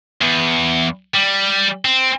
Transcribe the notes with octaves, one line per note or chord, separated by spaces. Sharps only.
E2
G3
C4